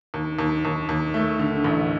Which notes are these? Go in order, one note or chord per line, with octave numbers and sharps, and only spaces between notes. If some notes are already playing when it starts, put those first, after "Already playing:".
D#2
D#2
D#2
D#2
A3
D3
A1